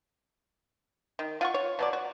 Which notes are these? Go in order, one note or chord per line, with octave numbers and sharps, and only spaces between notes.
D#3
F4 F#5 C#6
C#5
B2 F#3 D5
F#4